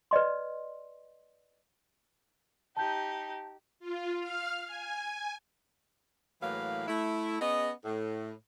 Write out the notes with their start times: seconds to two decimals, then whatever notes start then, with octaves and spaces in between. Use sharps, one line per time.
0.11 B4 D5 D#5 C6
2.77 D#4 G4 A5 G6
3.80 F4
4.19 F5 F6
4.66 G#5
6.41 A2 E3 F#3 A#3 B4 F5
6.88 A3 E4
7.40 B3 C#4 G#4 D#5
7.85 A2